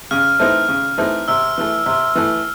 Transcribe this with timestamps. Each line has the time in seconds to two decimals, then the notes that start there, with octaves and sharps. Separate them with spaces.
0.11 C#3 F6
0.39 E3 A3 C4 D#4
0.68 C#3
0.98 E3 A3 C4 D#4
1.28 C3 E6
1.58 E3 A3
1.86 C3
2.15 E3 A3